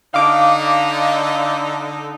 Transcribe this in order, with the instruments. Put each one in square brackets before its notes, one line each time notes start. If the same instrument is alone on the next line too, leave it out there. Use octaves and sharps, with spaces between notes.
[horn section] D3 D#4 [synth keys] F5 D6